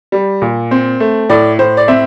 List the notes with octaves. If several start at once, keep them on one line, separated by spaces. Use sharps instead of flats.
G3
A#2
C4
A3
A2 D5
A2 C5
D5
C4 E5